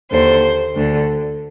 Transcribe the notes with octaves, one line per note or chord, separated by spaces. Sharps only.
D#2 D3 C5
D2 D3